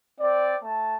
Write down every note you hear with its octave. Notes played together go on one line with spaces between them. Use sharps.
C4 D5
A3 A5